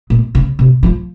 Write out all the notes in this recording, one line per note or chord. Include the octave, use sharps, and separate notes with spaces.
A#2
C#3
C3
F3